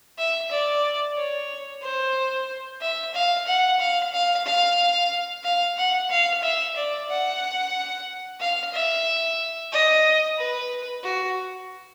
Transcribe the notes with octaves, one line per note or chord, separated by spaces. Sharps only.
E5
D5
C#5
C5
E5
F5
F#5
F5
F5
F5
F5
F#5
F5
E5
D5
F#5
F5
E5
D#5
B4
F#4